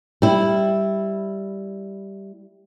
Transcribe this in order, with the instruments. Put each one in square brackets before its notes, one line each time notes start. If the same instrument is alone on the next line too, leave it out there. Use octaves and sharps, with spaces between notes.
[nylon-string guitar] G3 E4